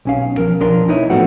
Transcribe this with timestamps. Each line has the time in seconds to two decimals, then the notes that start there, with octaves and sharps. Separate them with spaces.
0.05 B1 C#4 F5
0.38 F3 A#4
0.60 B1 F3 D4 A#4 C6
0.88 A3 D#4 E4 B4 C#5 D#5
1.10 A2 F3 A3 B3 C4 F#4